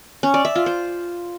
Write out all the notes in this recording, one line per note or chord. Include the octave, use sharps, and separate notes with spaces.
C#4
D5
E5
F4
C5